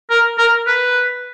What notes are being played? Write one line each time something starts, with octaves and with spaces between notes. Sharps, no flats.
A#4
A#4
B4